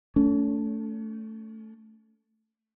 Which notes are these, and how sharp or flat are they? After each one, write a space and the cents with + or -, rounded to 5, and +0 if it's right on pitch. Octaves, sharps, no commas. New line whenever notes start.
A3 +5 C#4 +40